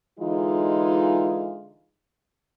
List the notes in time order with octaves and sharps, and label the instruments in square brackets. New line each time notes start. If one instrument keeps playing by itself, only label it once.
[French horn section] D3 E3 G#3 D#4 F4